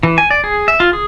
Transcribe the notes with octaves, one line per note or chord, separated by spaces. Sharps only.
E3
G#5
D5
G#4
E5
F4
G#4